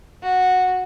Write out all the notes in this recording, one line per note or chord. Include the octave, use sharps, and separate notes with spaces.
F#4